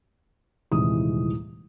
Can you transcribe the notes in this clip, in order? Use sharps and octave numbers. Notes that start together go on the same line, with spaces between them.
D#1 C2 E3 G#3 D#4 D#6